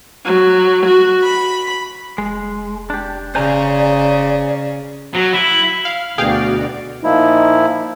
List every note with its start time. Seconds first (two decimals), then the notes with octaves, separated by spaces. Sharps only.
0.25 F#3
0.86 F#4
1.24 B5
2.18 F1 G#3
2.90 D4 G4
3.35 C#3 C5 D5 G#5 A#5
5.14 F#3
5.33 E4
5.85 F5
6.18 D2 B2 F#4 G#4 D5 F5 G5
7.04 A#2 F3 D#4 E4